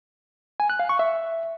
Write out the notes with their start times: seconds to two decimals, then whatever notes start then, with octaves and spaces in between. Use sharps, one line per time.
0.60 G#5
0.70 F#6
0.79 F5
0.89 C#6
0.99 E5